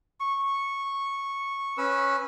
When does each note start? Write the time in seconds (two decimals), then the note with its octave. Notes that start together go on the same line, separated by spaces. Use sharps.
0.20 C#6
1.78 C#4 B4 E6